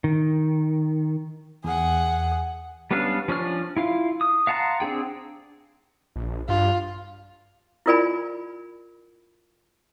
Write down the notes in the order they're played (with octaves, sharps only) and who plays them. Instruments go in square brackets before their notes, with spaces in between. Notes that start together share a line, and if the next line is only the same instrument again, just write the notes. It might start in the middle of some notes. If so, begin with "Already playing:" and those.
[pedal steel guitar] D#3
[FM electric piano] E2 [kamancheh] G#4 F#5
[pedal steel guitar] G3 B3 C#4 D4 F5
F3 C#4 D4 F6
E4 F4 F5
D#6
F5 F#5 A5 A#5 C6
C4 D4 G#4 G5
[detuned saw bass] A#1
[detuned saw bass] G2 [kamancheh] F4
[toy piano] E4 F4 A#4 D5 G#5 B5